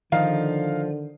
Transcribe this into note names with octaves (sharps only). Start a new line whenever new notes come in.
D3 D#3 F3 D#4 F5